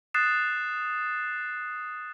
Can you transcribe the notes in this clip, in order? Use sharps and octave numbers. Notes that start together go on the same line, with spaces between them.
D#6 F#6 A6 C7 E7